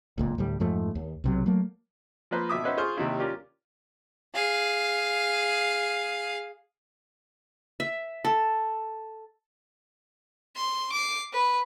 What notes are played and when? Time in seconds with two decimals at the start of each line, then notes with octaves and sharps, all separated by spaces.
0.18 D1 C#2 A#2
0.38 D2 A2 G3
0.60 F2 G#2 F3 A3
0.95 D#2
1.24 B1 C3 F#3
1.46 F#3 A3 A#3
2.31 F3 A#3 B4 C5
2.49 G#1 B2 E5 D6 D#6
2.64 C#4 D#4 B4 C5 E5 F#5
2.77 F4 G#4 C5 C#6 F6
2.97 D#2 C3 D#4 E4 F5
3.19 C#4 F4 G4 A#4 D5
4.34 G#4 F5
7.80 E5
8.25 A4
10.56 C6
10.92 D6 C7
11.33 B4